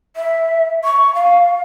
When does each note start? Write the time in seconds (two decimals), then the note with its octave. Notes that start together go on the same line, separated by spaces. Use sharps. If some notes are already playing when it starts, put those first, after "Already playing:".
0.16 E5
0.84 C#6
1.15 F5